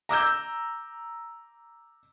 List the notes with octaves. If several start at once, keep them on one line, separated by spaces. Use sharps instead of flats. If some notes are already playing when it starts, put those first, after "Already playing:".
A#5 D6 E6 G6